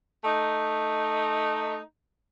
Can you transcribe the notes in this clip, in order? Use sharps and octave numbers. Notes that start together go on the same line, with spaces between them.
A3 D#4